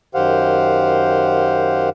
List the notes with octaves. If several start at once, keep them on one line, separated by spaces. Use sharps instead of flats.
F#2 D#3 G4 C5 F5 F#5